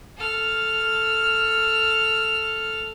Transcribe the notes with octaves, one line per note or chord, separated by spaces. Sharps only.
A4 F6